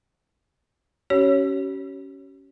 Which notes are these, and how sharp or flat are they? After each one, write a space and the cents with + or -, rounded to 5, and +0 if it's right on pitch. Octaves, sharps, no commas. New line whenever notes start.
C#4 +5 G4 -45 C#5 +0